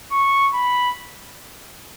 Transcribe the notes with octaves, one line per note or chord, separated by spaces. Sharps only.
C#6
B5